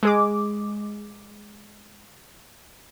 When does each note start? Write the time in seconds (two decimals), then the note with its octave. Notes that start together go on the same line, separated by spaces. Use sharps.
0.03 G#3 G#4 D6